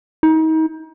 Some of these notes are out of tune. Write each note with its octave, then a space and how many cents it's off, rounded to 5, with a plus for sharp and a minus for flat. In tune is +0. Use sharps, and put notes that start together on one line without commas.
D#4 +35